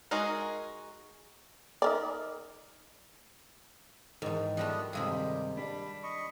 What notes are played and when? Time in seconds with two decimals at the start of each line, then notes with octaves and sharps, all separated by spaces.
0.11 G#3 D#4 F#4 G#4 A#4
1.82 D#4 A#4 D5
4.22 E2 G#2 D#3
4.57 F3 G3 A3 B3 D4 D#5
4.93 G2 C3 D#3 G#3 G#4 D#5 E5
5.10 G3 G4
5.57 G3 D4 B5
6.03 D#5 B5 C#6